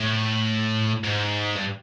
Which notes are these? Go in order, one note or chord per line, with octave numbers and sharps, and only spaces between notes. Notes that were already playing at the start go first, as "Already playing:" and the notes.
Already playing: A2
G#2
G2